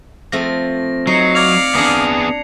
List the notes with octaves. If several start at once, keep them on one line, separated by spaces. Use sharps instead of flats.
F3 A3 C4 A#6
F#3 D#4 C7 C#7
D5 F5 G#6 F7
B3 D4 G#4 A#5